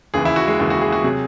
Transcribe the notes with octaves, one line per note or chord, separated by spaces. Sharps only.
D#2 C#3 E3 G#4
E4
F#4
G#3
D#2 C#3 E3 G#3
F#4
G#4
F#4
C3 F#3 G#4